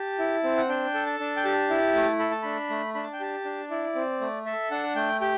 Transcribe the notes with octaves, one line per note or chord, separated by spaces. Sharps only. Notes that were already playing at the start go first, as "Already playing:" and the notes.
Already playing: G4 A5
E4
C4
F#5
D4 G5
A4
A5
D4
G5
G4 A5
E4
A3
A4 B5
A5
D4 B5
A3
D4 B5
A5
G5
G4 A5
D4
E4 D5
C4
A3
A4 E5
D4 F#5
A3 G5
G4 G5